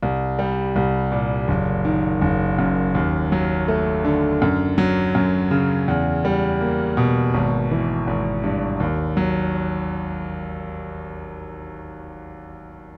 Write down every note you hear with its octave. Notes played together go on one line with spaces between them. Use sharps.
C2
G3
C2
A#2
F#1
D#3
F#1
F#2
D#2
F#3
A3
D3
F#2
F#3
F#2
C#3
E2
G3
A#3
B2
G#1
E3
G#1
G2
D#2
F#3